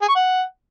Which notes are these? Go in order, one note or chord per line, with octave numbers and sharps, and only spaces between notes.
G#4
C#6
F#5